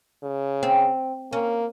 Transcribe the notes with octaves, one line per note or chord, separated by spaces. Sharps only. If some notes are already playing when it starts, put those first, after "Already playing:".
C#3
C4
A#3 C#4